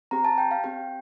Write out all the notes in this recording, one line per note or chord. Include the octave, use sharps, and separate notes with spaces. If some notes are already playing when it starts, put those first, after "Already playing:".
C4 G4 A#5
A5
G5
F5
C4 G4 G5